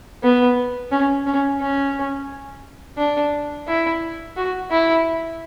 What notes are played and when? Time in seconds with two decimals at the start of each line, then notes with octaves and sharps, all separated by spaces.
0.23 B3
0.92 C#4
1.26 C#4
1.61 C#4
2.98 D4
3.67 E4
4.37 F#4
4.71 E4